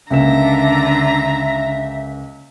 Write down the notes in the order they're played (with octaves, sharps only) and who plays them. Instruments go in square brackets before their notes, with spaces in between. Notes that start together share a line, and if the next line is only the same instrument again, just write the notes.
[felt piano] C#2 A#3 E7 [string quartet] D3 A#5 [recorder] E5